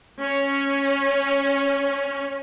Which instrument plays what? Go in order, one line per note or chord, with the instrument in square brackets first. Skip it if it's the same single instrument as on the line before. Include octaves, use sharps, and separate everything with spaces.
[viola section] C#4 C#5